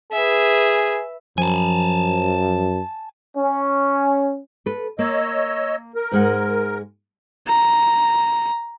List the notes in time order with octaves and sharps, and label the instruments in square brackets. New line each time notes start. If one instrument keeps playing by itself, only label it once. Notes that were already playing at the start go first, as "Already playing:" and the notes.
[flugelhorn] G#4 [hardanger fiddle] B4 E5
[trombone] F#2 [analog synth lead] F3 [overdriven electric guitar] G#5 A5
[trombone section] C#4
[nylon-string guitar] A4 B4
[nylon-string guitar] A#3 [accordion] C#5 D#5 E6
[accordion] A#4
[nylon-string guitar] G#2 G#3 F#5
[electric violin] A#5